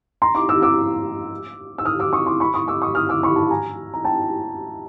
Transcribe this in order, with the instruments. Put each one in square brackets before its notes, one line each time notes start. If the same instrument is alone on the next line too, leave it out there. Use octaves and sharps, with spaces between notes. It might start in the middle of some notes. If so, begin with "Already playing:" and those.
[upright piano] A#5 C6
C6 D6
D6 E6
D6 E6
E6
D#6 F6
D6 E6
C#6 D#6
C6 D6
B5 C#6
C#6 D#6
D6 E6
C#6 D#6
D#6 F6
D6 E6
B5 C#6
A5 B5
G#5 A#5
A#5
G5 A5